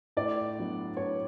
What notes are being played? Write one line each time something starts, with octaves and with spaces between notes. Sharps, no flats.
A2 D5
F#3 B3 D4
A2 C#5